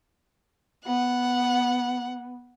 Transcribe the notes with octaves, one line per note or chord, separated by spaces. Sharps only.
B3 F#5